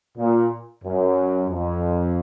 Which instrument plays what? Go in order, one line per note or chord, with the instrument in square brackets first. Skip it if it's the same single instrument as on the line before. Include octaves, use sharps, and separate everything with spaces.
[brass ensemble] A#2
F#2
F2